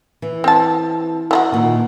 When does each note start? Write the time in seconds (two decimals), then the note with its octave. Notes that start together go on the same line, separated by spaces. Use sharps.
0.22 E3
0.44 C4 A5
1.31 E3 D#4 F#4
1.52 A#2 D#3